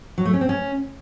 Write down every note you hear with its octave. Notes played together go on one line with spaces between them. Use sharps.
F#3
A3
C#4
C4
C#4